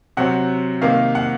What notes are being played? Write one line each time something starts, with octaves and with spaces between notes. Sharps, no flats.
C3 F#3 C4 F#5
C3 D#3 A#3 F5
F#5